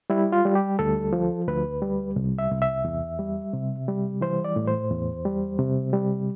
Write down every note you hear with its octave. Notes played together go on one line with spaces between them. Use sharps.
G3 E4
F4
G3
G4
D2 A4
F3
D2 B4
G3
C2
E5
C2
E5
E2
G3
C3
G3
E3 C5
D5
A2
C5
E2
G3
C3
G3